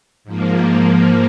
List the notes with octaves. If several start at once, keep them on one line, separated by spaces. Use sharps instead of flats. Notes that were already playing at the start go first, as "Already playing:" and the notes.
G#2 F3 A#3